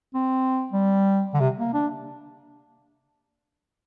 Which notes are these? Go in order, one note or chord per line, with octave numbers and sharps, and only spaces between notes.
C4
G3
D3
C3
A#3
D4